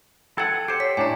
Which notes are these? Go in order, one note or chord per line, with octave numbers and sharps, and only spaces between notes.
A4 F#5 G5 A5 G#6
G4 C5 C7 C#7
C#5 B6
A2 D4 G#5 A#5